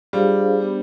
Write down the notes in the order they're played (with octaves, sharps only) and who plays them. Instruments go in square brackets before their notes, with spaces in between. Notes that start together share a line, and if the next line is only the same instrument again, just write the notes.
[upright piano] G3 [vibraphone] D4 F4 G#4 C5 F5
[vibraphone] B3 D4 G4 C5